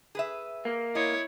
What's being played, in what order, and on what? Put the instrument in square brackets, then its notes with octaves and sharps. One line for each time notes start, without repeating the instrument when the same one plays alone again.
[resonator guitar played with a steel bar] G#4 B4 E5
[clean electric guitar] A#3
[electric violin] E4 C#5 [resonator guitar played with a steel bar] D#5